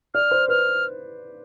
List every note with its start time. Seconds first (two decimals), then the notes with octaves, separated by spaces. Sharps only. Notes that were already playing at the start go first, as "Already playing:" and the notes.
0.14 D5 F6
0.31 C5
0.48 B4 F6